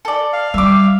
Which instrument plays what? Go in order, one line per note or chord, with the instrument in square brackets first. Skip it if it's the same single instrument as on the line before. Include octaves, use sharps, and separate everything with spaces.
[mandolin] A4 D5
[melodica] F5
[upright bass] G3 [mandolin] E5 D6